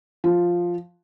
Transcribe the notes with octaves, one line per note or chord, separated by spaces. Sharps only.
F3